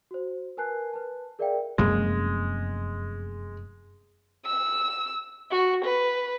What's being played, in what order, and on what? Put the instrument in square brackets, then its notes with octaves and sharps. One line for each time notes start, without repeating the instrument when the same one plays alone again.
[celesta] F#4 C5
A#4 B4 G#5 A5 F#6 C7
B4 A5
G#4 A#4 D5 E5 F5 G5
[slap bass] F1 F#2 A#3 [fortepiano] G#3
[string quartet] E6
F#4
B4